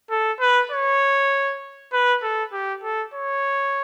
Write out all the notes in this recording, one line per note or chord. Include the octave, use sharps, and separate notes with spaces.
A4
B4
C#5
B4
A4
G4
A4
C#5